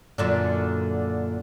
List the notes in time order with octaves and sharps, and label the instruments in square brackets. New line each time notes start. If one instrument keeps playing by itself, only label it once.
[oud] F#2 A#2 D3